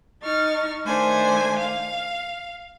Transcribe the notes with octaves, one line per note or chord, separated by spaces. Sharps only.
D#4 C#6 F6 A6
D#3 A3 D4 C5 G#5
F5